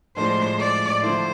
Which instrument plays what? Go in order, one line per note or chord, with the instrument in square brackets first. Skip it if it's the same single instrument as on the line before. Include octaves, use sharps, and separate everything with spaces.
[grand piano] A2 F3 G#3 D4 [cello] C5
[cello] D5
[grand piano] D3 F3 A3 E4 [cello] C5